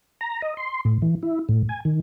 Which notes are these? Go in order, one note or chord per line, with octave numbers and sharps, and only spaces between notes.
A#5
D#5
C6
A2
E3
E4
A2
G#5
D#3